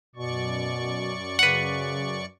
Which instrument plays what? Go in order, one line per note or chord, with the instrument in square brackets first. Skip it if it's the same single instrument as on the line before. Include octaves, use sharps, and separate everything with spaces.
[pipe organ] F#2 D5 C#6 [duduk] B2
[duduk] C#3 [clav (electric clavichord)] B4 F#5